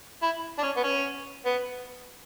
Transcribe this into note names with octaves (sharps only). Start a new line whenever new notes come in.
E4
D4
C#4
B3
C#4
B3